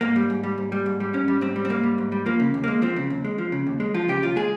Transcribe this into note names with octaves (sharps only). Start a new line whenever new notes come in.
G#2 A#3
G3
G#2
G3
G#2
G3
G#2
G3
G#2 C#4
G3
G#2 C4
G3
C4
G#2 A#3
G3
G#2
G3
F3 A#3
C#3
D#2
G#3 A#3
F3 C4
C#3
D#2
G#3
F3
C#3
D#2
G#3
F3 F4
C#3 G4
D#2 F4
G#3 G#4